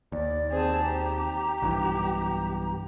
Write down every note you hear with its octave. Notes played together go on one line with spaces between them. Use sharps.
D#2 D5
C4 G#4 A5
G4 A#5
B1 G2 E3